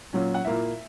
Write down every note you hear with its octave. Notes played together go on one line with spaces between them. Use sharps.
A#2 F#3 C#4
F#5
A#2 A#3 E4 E5